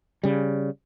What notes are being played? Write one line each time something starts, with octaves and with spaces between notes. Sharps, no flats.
C#3 G3